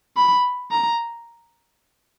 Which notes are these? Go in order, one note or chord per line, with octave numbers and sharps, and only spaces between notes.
B5
A#5